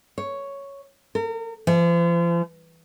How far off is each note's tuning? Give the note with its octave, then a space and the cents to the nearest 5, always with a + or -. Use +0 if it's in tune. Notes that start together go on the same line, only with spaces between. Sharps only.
C#5 +0
A#4 -35
F3 -40